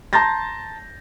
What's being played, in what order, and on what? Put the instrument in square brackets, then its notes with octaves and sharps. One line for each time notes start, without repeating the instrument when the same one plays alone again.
[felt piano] A5 A#5 C6 G6 A6 A#6